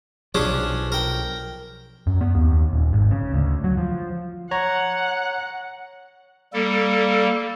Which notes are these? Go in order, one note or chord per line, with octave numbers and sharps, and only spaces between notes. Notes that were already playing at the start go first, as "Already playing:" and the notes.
B1 F3 C#4 D4 G#4
A#4 G5
F#2
B3
D#2
D#1
G#1
C#3
D2
F#3
F3
C#5 F#5 A#5
G3 A#3 A4